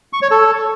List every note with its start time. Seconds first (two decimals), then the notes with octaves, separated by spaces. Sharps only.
0.13 C#6
0.22 C#5
0.31 A4